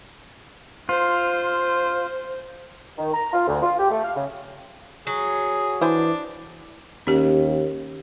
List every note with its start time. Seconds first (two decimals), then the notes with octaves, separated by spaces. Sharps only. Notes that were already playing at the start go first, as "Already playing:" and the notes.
0.89 F4 C5
2.98 D#3
3.14 A#5
3.33 F4
3.48 D2
3.63 F4
3.78 G4
3.90 A3
4.04 F5
4.15 C#3
5.07 F#3 G#4
5.81 E3 D4 E4 C5 G#5
7.07 D#2 C#4 G4